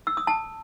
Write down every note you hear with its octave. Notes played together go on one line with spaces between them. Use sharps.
E6
D#6
A5